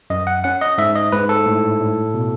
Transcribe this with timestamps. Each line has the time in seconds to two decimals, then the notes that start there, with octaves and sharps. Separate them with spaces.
0.10 F#2 D#5
0.27 F#5
0.44 C#4 F#5
0.61 D#5
0.78 G#2 E5
0.95 D#5
1.12 G#2 B4
1.29 A4
1.46 A2
1.80 A2
2.14 B2